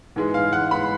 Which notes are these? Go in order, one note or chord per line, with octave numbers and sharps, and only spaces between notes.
G#2 E3 G#3
F5
F#5
G#2 E3 G#3 B5